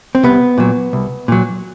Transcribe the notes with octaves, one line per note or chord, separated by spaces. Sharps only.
C4
C2 B3
A#2 F#3
C2
A#2 F#3